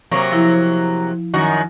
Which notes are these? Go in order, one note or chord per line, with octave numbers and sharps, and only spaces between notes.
C3 F#3 A#3 C#6
F3 E4
F#2 D#3 F#4